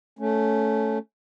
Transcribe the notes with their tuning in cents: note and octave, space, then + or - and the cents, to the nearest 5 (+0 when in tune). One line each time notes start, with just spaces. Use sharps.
A3 -5 C#4 +0